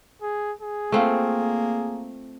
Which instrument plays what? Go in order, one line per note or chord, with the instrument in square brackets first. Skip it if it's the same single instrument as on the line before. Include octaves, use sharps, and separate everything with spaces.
[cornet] G#4
G#4
[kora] A3 C4 F4 [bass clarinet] A#3